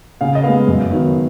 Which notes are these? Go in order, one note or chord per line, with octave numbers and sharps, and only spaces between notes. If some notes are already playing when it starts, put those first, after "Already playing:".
C#3 F5
D#5
G#3 B3 F5
F#2
D#3 F#3 B3